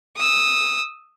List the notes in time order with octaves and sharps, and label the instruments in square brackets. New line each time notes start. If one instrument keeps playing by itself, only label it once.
[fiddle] D#6 E6